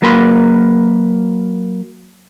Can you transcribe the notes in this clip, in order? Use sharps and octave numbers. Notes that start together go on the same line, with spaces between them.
F#3 A#3 A#4 B4 C6